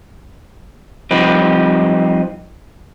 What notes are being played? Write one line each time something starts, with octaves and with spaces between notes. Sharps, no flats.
F3 G3 C4 D#4 B4